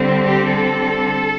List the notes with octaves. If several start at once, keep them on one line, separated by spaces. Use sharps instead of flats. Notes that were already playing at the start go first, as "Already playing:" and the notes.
Already playing: D3 G3 C4
G4
A4